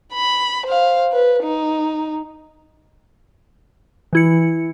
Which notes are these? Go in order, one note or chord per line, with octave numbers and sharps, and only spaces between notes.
B5
C5 F5
B4
D#4
E3 E4 C#7